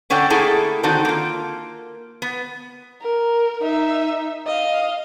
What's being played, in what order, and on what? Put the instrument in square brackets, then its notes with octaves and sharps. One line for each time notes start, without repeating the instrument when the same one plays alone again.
[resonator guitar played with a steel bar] D3 C#4 D4 A4 F#5 G5
A3 A#3 E4 G#4 A4
D3 D#3 C4 D#4 F#4 A4
A#3 F4
B3
[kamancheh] A#4
D#4 E5
D#5 F5